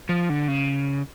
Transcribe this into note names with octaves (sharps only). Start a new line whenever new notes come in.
F3
D3
C#3